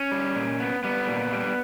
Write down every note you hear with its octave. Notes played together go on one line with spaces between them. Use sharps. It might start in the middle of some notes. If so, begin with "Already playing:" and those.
Already playing: C#4
G3
A#2
B3
G3 B3
A#2
G3